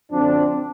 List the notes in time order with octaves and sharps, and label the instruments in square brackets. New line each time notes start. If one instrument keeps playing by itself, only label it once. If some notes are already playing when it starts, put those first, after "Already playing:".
[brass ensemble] F#2 D3 F3 C4 D4